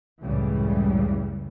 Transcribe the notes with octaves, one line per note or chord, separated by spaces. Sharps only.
C#2 F#2 A2 C#3 E3 G3